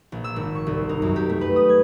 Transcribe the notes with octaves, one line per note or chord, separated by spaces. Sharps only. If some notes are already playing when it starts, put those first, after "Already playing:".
A#1
E6
G#1
C#6
C2
D#4
F#2
G4
A3
B4
D#6
G#6